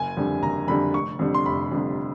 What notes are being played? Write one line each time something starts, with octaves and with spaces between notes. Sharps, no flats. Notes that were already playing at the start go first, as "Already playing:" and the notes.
Already playing: F#1 G#5
F2 D3 G3
F#1 A#5
F2 D3 G3 B5
F1 C#6
F2 D3 G3
C6
F1 B5
F2 D3 G3